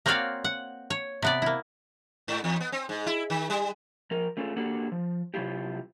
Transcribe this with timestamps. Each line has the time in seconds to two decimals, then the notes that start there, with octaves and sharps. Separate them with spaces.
0.06 A#3 C4 F#4 C#5 D5 F5
0.44 F#5
0.90 C#5
1.22 C3 B3 D5
1.42 A#3 E4
2.28 G#2
2.44 E2
2.60 B3
2.72 C4
2.89 G#2
3.07 E4
3.30 D#3
3.50 G3
4.11 F3 A#4
4.37 A3 C#4 F4 G#4 A4
4.56 A#3 D4 F#4 G4 A4
4.92 F3
5.34 C3 F#3 E4 F4 G4